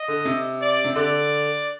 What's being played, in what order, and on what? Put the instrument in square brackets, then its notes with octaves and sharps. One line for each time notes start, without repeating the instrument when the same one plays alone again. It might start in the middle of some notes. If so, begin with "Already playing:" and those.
Already playing: [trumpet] D#5
[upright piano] D3
C3
[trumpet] D5
[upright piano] C3
[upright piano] D3 [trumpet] D5